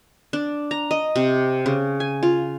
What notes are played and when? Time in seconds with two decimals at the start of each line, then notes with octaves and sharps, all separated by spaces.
0.33 D4
0.71 A#5
0.91 D#5
1.16 C3
1.66 C#3
2.00 G#5
2.23 F4